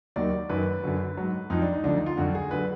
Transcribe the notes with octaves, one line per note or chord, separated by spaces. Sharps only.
D#2 D#3 F#3 D5
F#2 D#3 F#3 B4
F#2 D3 F#3
G#2 F#3
F2 F3 D#4
D4
D#4
D2 D3 F3 D4
D#4
F4
F2 D3 F#3 F#4
G#4
D3 F#3 B4